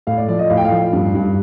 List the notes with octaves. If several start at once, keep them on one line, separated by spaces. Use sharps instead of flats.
A2 F5
D5
F3 D5
D#5
A2 F5
G5
F5
F3
G2
G2